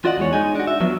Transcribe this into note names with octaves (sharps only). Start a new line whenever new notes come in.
F4 F#4 D5 D#5 F#5
E2 G#3 C#5
G#3 D#4 G#5
D4 F#4
E5
F3 F#3 B3